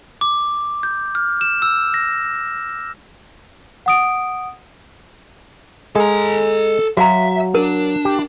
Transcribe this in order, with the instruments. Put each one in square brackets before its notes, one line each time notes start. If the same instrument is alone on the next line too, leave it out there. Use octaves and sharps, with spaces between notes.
[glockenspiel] D6
G6
F6
E7
E6
A#6
[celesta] F#5 D#6 D7
[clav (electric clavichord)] G#3 G#4 [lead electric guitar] A4 A#5
[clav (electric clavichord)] F#3 [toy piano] F#4 F5 A#5 [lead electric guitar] E5
[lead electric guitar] D4 [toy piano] A#4
[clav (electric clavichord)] G4